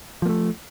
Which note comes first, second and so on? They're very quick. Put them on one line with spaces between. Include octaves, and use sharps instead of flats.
F3 A#3 A3